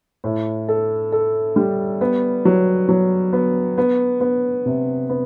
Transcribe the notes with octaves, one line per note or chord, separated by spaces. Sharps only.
A2
A4
A4
G3
B3
F#3
F#3
B3
B3
B3
C3
B3